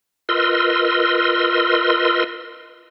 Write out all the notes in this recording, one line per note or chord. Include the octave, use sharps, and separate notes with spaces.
F4 A#4 B4 D#5 C6 E6